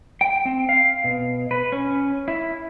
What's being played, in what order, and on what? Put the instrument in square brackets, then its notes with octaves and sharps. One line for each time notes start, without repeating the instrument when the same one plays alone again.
[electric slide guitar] G5
C4
F5
B2
B4
C#4
E4